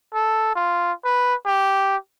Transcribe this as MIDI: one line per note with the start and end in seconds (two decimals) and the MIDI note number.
0.14 0.54 69
0.56 0.92 65
1.05 1.34 71
1.47 1.97 67